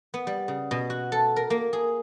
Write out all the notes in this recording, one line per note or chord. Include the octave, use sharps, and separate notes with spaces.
B3
G3
C#3
B2
F#4
A4
A#4
A#3
G#4